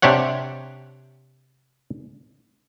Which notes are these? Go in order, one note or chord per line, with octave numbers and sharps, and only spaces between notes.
C3 D4 G4 C#5 F#5